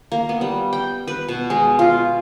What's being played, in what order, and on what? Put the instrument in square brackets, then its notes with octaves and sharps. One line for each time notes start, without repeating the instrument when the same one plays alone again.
[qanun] A#3
B3
G3
G5
B4
B2
G#3
F4